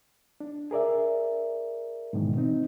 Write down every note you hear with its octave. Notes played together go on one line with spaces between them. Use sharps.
D4
G#4 A#4 D5 E5
G#2 B2 D#3 E3
C4 D#4